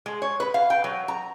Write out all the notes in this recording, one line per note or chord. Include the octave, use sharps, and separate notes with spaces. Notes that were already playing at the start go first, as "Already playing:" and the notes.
G#3
C#5
B4
F5
G5
F#3
A#5